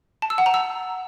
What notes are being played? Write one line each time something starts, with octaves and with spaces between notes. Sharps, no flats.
A5
E6
F#5
A#5
E6